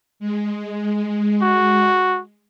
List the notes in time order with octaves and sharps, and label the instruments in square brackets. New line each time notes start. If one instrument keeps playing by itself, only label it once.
[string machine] G#3
[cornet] F#4